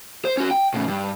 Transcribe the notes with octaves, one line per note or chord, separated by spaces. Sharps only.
C5
C#4 F#4
G5
A2 C#3
G2